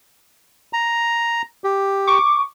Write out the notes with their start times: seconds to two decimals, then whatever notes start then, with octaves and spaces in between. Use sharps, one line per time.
0.73 A#5
1.64 G4
2.07 C#6 D6